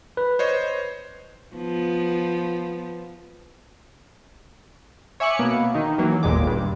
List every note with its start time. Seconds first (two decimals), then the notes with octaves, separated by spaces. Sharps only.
0.17 B4
0.39 C5 C#5 D#5
1.56 F3 B3
5.20 C#5 E5 G#5 D6 F#6 C#7
5.39 B2 A#3 B3
5.74 D#3 D#4
5.98 E3 F#3 A#3
6.23 G1 D#2 A#2 G#3 D6
6.47 G2